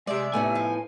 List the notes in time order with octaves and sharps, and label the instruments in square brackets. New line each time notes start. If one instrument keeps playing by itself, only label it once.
[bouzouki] C3 D5 [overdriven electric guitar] G#3 [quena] E5
[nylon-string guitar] A2 B3 D#4 [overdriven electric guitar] G#5
[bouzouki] F3